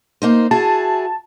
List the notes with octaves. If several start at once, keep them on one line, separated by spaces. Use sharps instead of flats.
A#3 D#4 C5
E4 F#4 G#4 A5